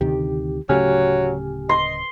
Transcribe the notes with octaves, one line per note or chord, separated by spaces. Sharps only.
D2 C3 D#3 G4
D1 C#3 F#3 A3 G4 G#5 F6
D#5 C6